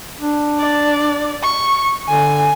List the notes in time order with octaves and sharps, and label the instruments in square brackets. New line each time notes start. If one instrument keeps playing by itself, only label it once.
[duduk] D4
[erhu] D5
C#6
[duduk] D3 [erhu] G#5